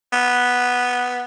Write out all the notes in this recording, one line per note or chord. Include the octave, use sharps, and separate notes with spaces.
B3